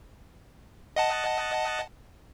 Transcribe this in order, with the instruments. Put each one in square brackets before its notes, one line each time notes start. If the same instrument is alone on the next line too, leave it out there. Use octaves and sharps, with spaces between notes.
[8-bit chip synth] D#5 F#5 A5